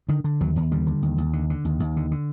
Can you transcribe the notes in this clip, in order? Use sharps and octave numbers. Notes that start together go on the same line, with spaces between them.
D3 D#3
D3
D#2 F#3
D#2
D3 G3
D3
D#2
D#2
D3
D3
D#2
D#2
D3
D3